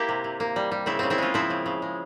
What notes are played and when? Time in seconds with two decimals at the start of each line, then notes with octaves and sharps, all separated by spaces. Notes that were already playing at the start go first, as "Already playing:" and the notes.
Already playing: A#3 E4 G4
0.09 C3
0.24 C3
0.40 A#3
0.56 G3
0.71 G3
0.86 C#3 C4 E4
0.99 C#3 C4
1.10 C4 E4
1.18 G#3 C#4 F4
1.34 F3 C4 E4
1.50 C#3
1.66 C#3
1.82 G#3